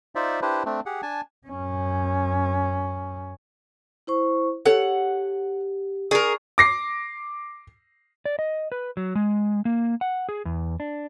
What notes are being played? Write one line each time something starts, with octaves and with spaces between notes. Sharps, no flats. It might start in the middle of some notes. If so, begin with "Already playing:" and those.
D#4 F4 C5 D5 E5
D4 E4 G4 B4 C5
A3 C4 D4
G4 G#4 F#5
D4 G#5 A5
F#2 C#4
E4 C5 C#6
G4 A4 C#5 F#5
G#4 A#4 D5 C#6
D6 A#6 C7
D5
D#5
B4
F#3
G#3
A#3
F#5
G#4
E2
D4